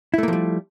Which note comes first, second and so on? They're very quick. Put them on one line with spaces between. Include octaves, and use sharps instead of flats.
E4 A3 A#3 F3 G3